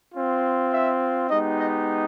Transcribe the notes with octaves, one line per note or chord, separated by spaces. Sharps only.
C4 F4
E5
G#3 B3 D#4 G4 D#5
D#5